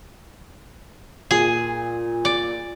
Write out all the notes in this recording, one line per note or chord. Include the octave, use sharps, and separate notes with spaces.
A#2 G#4
D5